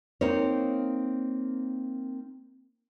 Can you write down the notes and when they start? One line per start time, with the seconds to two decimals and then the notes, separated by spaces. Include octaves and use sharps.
0.21 A#3 C4 D#4 A#4 C#5